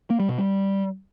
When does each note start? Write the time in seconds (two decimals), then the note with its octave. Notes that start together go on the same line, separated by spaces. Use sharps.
0.10 A#3
0.20 G3
0.29 B2
0.38 G3